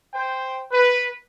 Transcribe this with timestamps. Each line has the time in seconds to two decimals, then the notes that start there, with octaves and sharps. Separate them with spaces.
0.13 C5 G5
0.72 B4